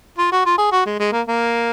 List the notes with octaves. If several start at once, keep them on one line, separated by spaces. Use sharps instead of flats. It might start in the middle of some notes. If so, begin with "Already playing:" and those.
F4
F#4
F4
G#4
F#4
G#3
G#3
A#3
A#3